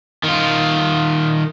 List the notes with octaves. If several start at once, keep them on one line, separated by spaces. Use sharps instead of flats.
D#3 F4